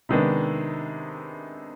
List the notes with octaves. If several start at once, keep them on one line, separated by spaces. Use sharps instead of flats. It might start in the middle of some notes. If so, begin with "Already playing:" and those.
C3 D#3 G#3 B3 D4